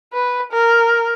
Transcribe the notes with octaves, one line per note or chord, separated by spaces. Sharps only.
B4
A#4